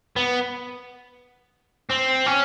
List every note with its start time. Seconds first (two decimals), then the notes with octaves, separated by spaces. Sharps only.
0.16 B3
1.90 C4
2.26 C#4